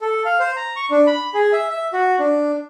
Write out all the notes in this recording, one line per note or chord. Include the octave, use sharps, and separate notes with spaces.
A4
F5
C5
A#5
C#6
D4
B5
G#4
E5
E5
F#4
D4